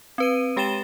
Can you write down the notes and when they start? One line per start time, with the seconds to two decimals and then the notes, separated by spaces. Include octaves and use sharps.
0.18 C4 B4 D#7
0.57 G#3 G4 G5 A6 E7 G7